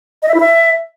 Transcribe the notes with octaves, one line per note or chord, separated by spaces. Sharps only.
D#5
E5
E4
E5